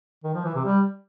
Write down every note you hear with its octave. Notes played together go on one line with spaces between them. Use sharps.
D#3
F3
E3
C3
G3